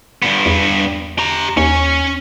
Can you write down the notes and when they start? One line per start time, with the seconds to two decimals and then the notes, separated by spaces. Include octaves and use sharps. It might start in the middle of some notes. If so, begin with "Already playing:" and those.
0.22 G2 B3
0.46 E2
1.19 G4 A#5
1.57 D#2 C#4